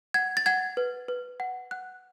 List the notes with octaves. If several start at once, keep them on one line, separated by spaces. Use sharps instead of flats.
F#5 G#6
A6
F#5 G#6
B4
B4
F#5
F#5 F#6